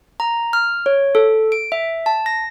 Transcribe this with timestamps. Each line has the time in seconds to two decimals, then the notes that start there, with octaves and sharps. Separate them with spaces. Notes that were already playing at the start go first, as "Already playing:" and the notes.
0.20 A#5
0.53 F6
0.86 C#5
1.15 A4
1.52 D7
1.72 E5
2.06 A5
2.26 A#6